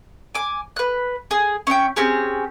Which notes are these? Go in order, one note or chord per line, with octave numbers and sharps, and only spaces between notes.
G#5 D6
B4 F#6
G#4
C#4 E5 F5 G5
C4 C#4 G4 G#4